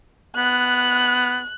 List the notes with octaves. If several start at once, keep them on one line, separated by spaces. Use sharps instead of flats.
B3 F#6